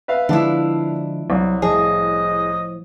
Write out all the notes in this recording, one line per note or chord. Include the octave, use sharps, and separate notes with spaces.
B4 E5 F5
D3 F3 G#3 D4 E4
C2 F#3
A2 F3 G#4 D#5